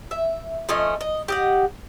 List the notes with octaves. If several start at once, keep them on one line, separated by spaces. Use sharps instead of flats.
E5
F3 A3 C#4 D#5
D#5
G4 D#5 F#5